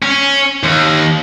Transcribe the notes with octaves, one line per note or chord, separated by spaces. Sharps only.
C#4
D#2